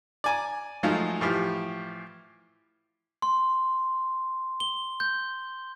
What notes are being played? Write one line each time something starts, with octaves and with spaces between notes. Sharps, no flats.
D5 G#5 A#5
F3 F#3 G#3 A3 D#4 F5
A2 E3 F3 G4
C6
G7
G6